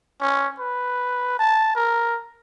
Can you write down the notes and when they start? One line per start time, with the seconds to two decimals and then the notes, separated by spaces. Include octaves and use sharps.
0.21 C#4
0.59 B4
1.39 A5
1.75 A#4